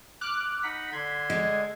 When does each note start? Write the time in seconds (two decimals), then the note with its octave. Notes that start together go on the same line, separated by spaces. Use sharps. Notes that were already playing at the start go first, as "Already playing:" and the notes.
0.21 D6 F6 F#6
0.63 D#4 F#5 B5 B6
0.92 D3 C6 G#6
1.30 G#3